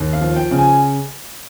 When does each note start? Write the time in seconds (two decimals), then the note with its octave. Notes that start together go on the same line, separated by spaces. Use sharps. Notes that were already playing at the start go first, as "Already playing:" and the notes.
Already playing: D#2
0.13 F5
0.21 F3
0.36 G5
0.51 C#3
0.58 G#5